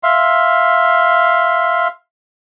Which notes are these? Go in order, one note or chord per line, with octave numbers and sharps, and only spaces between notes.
E5 F5 C6